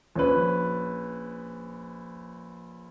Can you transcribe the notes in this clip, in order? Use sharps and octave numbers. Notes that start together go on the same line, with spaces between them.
A#1 C#4 B4